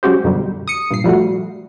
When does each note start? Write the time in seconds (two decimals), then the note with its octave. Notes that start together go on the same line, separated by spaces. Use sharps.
0.03 F#3 G#3 C#4 F#4 G4 C5
0.24 F#2 B2 D3 F#3 G3
0.68 D#6 C#7
0.91 G2 A#2 C7
1.04 F3 G3 A3 F#4